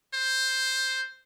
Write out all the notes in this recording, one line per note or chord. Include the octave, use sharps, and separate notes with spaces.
C5